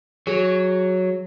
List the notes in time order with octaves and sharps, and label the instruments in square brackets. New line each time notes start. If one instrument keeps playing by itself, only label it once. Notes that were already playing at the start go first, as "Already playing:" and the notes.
[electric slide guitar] F#3 [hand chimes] G#4